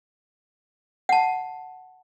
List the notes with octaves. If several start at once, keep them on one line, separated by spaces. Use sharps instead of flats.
F#5 A5